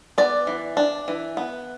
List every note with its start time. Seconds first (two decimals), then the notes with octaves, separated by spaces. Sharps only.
0.18 B3 D5
0.47 E3
0.77 D4
1.08 E3
1.37 B3